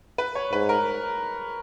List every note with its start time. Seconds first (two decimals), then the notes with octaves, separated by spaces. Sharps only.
0.18 B4
0.35 C#5
0.53 G#2 B4
0.69 A#4